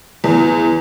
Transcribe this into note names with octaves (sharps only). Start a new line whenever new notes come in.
E2